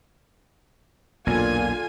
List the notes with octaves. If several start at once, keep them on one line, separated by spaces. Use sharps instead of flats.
B1 E2 A#2 D3 F4 G#5